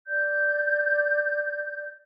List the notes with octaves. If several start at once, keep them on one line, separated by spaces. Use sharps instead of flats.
D5 G6